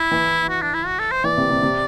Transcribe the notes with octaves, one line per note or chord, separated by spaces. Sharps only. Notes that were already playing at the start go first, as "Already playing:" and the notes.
Already playing: E4
E3
F#4
D4
E4
F#4
A4
C5
E3 D5
C3
C3
C3